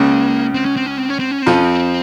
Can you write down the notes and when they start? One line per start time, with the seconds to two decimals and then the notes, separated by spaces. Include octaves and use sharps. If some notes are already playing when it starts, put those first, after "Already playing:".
Already playing: C#2 C#3 A#3
0.54 C4
0.65 C#4
0.76 C4
0.86 C#4
0.98 C4
1.09 C#4
1.19 C4
1.31 C#4
1.42 F2 F3 C4
1.53 C#4
1.64 C4